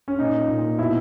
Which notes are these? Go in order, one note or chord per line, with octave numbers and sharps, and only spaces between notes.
C#4
A#2 D#4
A#2
B2 E4